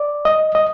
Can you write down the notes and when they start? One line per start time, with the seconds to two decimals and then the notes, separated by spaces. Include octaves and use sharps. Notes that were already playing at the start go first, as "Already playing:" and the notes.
Already playing: D5
0.25 D#5
0.55 D#5